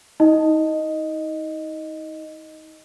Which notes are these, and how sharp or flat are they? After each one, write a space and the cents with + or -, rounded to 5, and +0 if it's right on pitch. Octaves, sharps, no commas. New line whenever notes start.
D#4 +35 D#5 +0